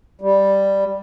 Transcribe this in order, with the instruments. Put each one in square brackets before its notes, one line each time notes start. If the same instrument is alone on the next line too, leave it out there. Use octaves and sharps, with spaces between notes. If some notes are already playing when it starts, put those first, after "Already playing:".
[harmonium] G3